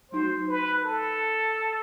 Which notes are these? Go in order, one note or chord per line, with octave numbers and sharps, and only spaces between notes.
F#3 A3 D#4 F#4 C5
B4
A4